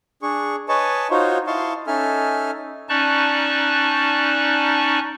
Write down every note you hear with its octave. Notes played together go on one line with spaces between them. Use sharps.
D4 G#4 C#6
B4 C#5 D#5 G#5 A5 C#6
D#4 F4 F#4 C5 C#5
E4 D#5 F5 A5 C6 C#6
C#4 D#4 A4 E5 G#5 F6
C#4 D#4 D5 A5 C#6 F#6